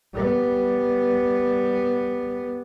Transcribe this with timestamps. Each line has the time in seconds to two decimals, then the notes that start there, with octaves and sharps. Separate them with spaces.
0.14 G3 B3